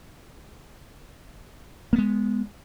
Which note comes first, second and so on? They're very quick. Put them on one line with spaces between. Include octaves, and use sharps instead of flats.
A#3 B3 G#3